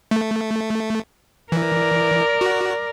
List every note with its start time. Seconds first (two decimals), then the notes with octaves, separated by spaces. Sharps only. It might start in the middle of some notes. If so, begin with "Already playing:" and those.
0.11 A3
1.52 E3 A#4 D5
2.41 F#4